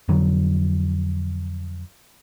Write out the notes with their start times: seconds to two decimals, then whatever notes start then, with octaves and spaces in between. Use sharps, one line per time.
0.08 F2 D3 F#3